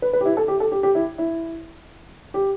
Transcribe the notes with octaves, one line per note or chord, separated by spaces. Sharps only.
B4
B4
G4
E4
A4
G4
A4
G4
G4
E4
E4
G4